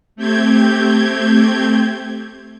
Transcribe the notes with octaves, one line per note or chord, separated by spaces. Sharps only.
A3 C4 G4 G6 G#6